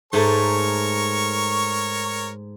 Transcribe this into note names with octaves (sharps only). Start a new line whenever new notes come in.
G#2 A3 A#4 C#5 C#6